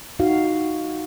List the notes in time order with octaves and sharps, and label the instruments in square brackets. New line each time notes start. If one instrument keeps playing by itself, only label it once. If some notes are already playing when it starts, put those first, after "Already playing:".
[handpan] D#4 F#4 F5